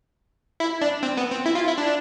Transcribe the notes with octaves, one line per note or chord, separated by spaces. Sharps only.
E4
D4
C4
B3
C4
E4
F4
E4
D4